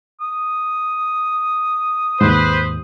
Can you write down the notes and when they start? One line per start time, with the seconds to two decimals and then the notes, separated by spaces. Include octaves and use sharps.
0.21 D#6
2.21 D#2 G#2 B4 C5